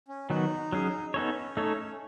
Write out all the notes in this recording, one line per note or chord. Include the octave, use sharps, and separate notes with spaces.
C#4
D#3 F#3 B3 D#4 F#4
F#3 C#4 G#4
B3 C#4 D#4 A4 C#5
A3 D#4 A4 C#5